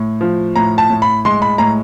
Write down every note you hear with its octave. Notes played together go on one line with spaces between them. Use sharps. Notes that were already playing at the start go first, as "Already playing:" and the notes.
Already playing: A2
F3
A2 A#5
A5
A2
B5
G#3 C6
B5
A2 A#5